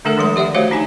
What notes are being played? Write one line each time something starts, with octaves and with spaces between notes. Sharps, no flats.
D3 A3 D4 A4 A#4 F#5
D#3 F3 G#3 C6
G4 D5 E5 F#5
A3 F#4 G4 C5 C#5 F5
D4 D#4 G#5